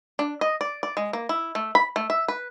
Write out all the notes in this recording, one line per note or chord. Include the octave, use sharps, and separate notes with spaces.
D4
D#5
D5
D5
G#3
A#3
E4
A3
B5
A3
E5
B4